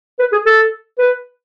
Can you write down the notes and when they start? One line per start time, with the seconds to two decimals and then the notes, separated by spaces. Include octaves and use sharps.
0.19 B4
0.32 G#4
0.46 A4
0.99 B4